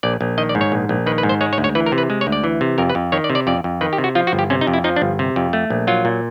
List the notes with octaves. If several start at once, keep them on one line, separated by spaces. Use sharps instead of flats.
A#1 D5
A#1
D#3 D#5
D5
G#2
C#5
A#1
A#1
D#3 B4
B4
G#2
C5
G#3 C#5
C#5
D2
C#5
E3 B4
A#4
C3
B4
G#3
C#5
D2
D5
E3
C3
F2 A#4
B4
F2
D#3 C#5
D5
C3
D5
F2 D5
F2
D#3 B4
G4
C3
F#4
F3 F4
F#4
G1
G4
C3 C#4
D#4
F2
E4
F3 D#4
D4
G1
C3
F2
A3
A#1
F#3 F4
A#2